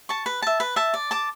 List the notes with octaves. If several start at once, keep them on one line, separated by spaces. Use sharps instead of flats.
A5 C#6
B4
E5 A5
B4
E5 A5
D5
A5 D6